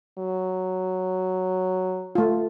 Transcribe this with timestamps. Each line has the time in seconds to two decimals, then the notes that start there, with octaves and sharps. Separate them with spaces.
0.18 F#3
2.15 A3 F4